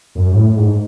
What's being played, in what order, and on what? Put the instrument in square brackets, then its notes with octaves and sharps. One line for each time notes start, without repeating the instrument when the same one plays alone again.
[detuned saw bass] F#2
G#2
A2
G#2